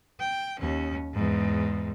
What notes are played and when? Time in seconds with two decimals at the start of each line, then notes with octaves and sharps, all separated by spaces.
0.20 G5
0.59 D#2 C#4
1.14 E2 G#2